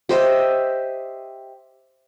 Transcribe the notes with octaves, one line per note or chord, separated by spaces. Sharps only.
G4 C5 D#5 E5